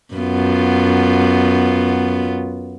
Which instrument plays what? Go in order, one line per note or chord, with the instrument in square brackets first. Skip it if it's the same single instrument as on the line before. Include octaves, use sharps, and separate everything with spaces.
[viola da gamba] F#2 B3 F4